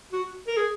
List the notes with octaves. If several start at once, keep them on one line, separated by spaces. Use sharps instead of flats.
F#4
A#4
G#4